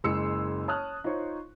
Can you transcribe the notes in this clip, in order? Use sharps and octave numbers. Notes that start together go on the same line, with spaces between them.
F#1 G#3 C6 E6 C#7
C#5 A5 D#6 F6 F#6
D#4 F4 C5 C#5 C#6